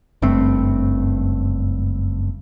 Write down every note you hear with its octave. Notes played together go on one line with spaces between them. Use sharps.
F#1 G2 A3 C4